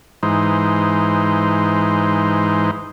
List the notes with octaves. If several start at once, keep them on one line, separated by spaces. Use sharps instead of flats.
G#2 E3 D#4 C5